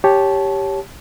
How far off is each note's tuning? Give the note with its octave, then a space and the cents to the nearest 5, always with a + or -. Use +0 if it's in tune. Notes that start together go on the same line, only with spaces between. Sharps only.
G4 +0 C#5 +0 A5 -20